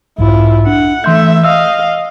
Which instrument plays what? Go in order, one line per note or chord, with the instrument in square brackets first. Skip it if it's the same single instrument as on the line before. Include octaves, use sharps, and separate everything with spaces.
[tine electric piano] B1 F2 G#2 [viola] E4 F4
[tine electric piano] D4 [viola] F#5
[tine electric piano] E3 C6 G6 [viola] A3 E5
[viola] D#5 F5 [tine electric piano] E6